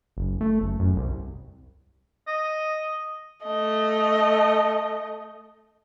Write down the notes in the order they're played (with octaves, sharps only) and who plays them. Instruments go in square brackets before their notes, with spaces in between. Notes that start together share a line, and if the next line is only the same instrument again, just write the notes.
[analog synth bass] F#1
A3
F#1
F#2
C2
[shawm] D#5
[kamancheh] A3 D#5